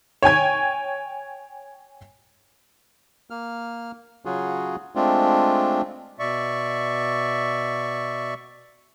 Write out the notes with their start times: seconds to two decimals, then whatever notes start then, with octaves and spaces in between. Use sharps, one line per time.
0.22 C#5 G5 G#5 G#6
3.30 A#3 F6
4.25 C#3 F#3 F4 F#4 G#4
4.95 G#3 A3 C4 D4 F4
6.19 B2 D5 E5 C#6